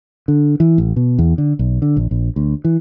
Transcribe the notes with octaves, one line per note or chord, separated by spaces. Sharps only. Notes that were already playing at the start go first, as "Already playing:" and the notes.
D3
E3
A1
B2
E2
D3
B1
D3
A#1
A#1
D2
E3